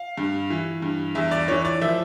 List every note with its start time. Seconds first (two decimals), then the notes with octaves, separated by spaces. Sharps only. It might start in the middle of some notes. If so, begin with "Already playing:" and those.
Already playing: F5
0.18 G2
0.50 E3
0.82 G2
1.15 E2 E5
1.31 D5
1.48 E3 C#5
1.65 D5
1.81 F3 E5